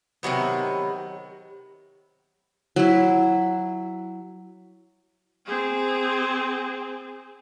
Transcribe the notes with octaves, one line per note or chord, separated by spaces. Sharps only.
C3 D#3 F#3 B3
F#3 E4
C4 G#4